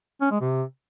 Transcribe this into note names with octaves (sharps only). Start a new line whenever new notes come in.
C#4
G#3
C3